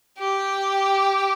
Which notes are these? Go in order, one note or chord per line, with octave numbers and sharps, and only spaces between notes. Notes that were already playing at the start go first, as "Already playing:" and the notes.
G4